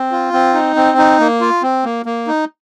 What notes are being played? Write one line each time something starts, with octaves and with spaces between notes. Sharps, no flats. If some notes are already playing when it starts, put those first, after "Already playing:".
Already playing: C4
F4
C4
D#4
C4
D#4
A#3
F4
C4
A#3
A#3
D#4